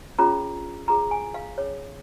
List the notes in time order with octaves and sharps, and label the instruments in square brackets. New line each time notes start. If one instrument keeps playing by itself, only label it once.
[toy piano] C#4 F4 G#4 C#5 A#5
F4 G#4 C#5 A#5
G#5
F5
C#4 G#4 C#5